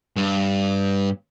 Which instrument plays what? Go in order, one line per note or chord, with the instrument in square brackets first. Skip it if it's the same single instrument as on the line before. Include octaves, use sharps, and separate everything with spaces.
[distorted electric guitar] G2